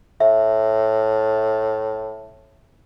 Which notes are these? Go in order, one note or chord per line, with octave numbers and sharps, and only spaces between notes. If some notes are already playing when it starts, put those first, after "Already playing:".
A2 E5